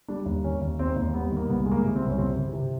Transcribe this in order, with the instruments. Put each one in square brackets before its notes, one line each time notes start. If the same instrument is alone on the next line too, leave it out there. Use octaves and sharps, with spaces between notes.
[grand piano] G3 D4
D#2
D#3 C#4
D#2
D#2 C4
D#2
G3 B3
D#3 A#3
C2 B3
G#3
A#3
C3
C4
C2
C#4
C3 C4
C3
C3